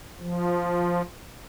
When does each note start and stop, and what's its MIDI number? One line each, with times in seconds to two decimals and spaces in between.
0.20 1.02 53